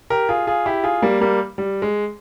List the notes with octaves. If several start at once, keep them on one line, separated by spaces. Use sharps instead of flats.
G4 A#4
F4 G#4
F4 G#4
E4 G4
F4 G#4
G3 A#3
G3 A#3
G3
G#3